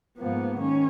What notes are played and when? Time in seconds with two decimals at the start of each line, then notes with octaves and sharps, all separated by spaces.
0.18 G#2 F3 A#3 B3
0.59 D#3 C#4